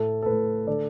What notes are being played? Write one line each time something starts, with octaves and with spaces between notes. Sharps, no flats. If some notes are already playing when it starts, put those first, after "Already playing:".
Already playing: A2 A3 A4
A4
A2 A3 B4
D3 A3 A4 D5